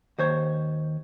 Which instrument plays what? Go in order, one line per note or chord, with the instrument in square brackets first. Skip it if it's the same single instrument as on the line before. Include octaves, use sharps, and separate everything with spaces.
[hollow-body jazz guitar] D#2 C5 C#5